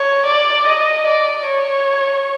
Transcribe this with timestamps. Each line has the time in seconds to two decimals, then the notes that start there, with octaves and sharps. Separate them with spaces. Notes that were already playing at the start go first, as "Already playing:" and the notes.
Already playing: C#5
0.26 D5
0.67 D#5
1.07 D5
1.47 C#5